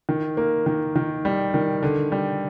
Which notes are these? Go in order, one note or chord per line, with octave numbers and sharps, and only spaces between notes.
D#3
A#3
D#3
D#3
G3
D#3
D3
G3